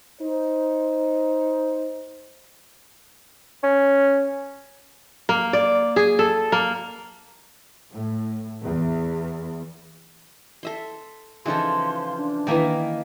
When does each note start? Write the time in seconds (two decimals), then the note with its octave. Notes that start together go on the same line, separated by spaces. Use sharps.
0.21 D#4 C5
3.63 C#4
5.29 A#3
5.53 D5
5.96 G#4
6.19 A4
6.52 A#3
7.91 A2
8.63 E2
10.63 A4 E5 C6
11.46 C#3 E3 F3 D#4 A4 C6
12.17 D4
12.47 D#3 E3 A#3 E5 G#5